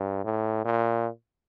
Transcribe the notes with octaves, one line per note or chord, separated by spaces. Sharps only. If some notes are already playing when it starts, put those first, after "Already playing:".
Already playing: G2
A2
A#2